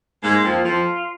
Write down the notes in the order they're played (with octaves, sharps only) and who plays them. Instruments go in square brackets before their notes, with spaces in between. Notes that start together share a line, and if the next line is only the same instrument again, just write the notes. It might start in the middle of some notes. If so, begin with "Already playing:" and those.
[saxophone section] G#2 G#3 [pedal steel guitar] A#3
[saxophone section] F2 F3
[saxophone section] F2 F3 [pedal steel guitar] F4